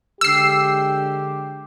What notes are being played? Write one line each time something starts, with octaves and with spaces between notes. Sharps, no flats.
D3 G#3 G4 E6 C7